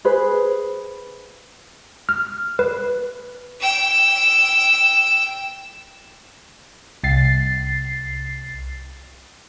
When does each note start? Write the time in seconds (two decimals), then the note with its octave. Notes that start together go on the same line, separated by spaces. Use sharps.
0.05 G#4 B4 C5
2.09 F6
2.59 B4
3.60 G5 E6
7.04 C2 A6 C7